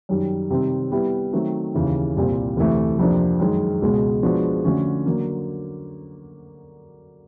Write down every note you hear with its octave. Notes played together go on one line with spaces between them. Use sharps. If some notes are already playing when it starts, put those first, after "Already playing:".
F#2 D#3 G3
C3 D#3 G3 C4
G3 B3 E4 G4
D#3 F#3 A3 C4
D#2 C#3 E3
C2 A#2 G3 C4
D2 C3 E3 A3
F2 C3 F3 A#3 D4
F#2 D#3 G#3
C#2 B2 G#3
F3 G#3 B3 D4 F#4
D3 F3 A3 C#4 F#4
D3 F#3 A#3